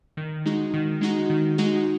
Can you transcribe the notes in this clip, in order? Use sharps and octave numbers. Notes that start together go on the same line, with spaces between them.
D#3
G#3 D#4 F#4
D#3
G#3 D#4 F#4
D#3
G#3 D#4 F#4